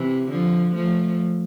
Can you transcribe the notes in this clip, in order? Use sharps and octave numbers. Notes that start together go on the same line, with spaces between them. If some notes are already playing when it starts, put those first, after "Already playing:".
Already playing: C3 E3
D3 F3
F3 A3